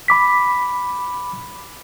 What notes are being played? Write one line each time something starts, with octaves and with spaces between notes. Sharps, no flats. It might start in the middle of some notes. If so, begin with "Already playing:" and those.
B5 D6 B6